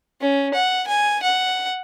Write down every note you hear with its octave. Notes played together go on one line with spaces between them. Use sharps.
C#4
F#5
G#5
F#5